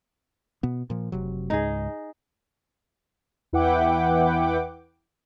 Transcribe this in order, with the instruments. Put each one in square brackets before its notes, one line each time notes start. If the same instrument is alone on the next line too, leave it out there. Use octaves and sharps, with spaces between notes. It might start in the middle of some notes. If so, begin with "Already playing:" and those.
[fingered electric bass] B2 B3
A#2 F3
F1 C3 F#3
[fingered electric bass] C#2 G#2 G#3 [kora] D#4 G#4
[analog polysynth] E2 E4 B4 F#5 G5 D6